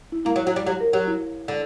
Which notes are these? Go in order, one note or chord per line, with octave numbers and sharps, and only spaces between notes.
E4
A#3 E4
F#3
F#3 F#4
G3
F#3 G4
A#4
F#3 G4
E4
D3